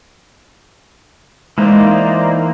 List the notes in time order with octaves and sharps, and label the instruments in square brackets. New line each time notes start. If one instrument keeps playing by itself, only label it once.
[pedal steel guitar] E3 A#3 [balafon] G#3 [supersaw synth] D#4 C5 D5